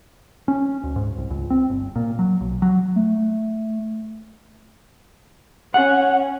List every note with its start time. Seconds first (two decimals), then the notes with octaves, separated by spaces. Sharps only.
0.48 C#4
0.83 D2
0.96 G#2
1.18 C2
1.30 C#2
1.50 C4
1.70 G1
1.96 A#2
2.19 F#3
2.40 B1
2.62 F#3
2.96 A3
5.74 C#4 F#5